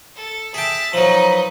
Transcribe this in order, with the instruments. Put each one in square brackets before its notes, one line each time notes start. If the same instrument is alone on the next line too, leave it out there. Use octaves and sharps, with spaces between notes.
[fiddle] A4
[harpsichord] G#4 G5 [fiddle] E5 A5
[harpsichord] F3 F#3 [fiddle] D#4 B4